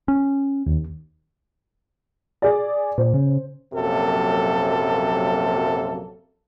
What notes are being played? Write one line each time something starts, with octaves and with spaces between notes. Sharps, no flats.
C#4
D#2
G#4 D5
A#2 C5
C#3
A#1 F#2 C3 F#3 A#3 A4